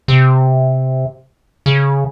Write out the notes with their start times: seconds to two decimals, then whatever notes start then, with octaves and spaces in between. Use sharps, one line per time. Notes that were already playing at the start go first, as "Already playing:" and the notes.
0.08 C3
1.66 C#3